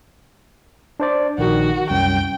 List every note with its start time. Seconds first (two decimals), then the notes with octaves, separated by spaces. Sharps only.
1.00 D4 C5 D5
1.38 A#1 D#3 F#4
1.90 C2 F#2 G5